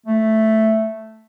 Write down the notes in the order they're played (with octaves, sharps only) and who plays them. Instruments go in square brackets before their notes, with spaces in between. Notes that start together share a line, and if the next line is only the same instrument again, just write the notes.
[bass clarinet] A3